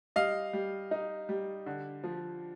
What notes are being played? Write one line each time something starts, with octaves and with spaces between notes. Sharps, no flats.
G3 D#5 F5
G3
D#4
G3
D3
F3